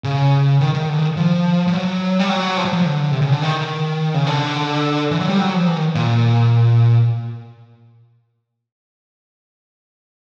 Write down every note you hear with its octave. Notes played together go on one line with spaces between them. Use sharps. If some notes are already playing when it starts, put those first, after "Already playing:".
C#3
D#3
D#3
D3
D#3
F3
F3
F#3
G3
F#3
F3
F#3
F3
D3
C3
C#3
D3
D#3
C#3
D3
E3
F#3
G3
F#3
F3
E3
D#3
A#2